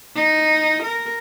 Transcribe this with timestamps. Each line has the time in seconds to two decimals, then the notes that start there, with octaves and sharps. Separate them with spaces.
0.15 D#4
0.82 A#4